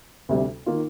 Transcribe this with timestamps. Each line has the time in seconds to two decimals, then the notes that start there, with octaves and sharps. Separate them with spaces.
0.29 D2 C3 G3
0.66 D#3 A#3 F4